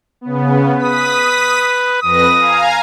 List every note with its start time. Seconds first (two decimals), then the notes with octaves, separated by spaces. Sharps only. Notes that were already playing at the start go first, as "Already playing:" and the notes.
0.21 C#3 B3
0.78 B4 D#6 B6
2.03 F2 B4 D#6 A#6
2.38 F5 G#5 A#5